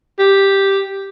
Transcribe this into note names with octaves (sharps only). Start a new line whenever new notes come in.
G4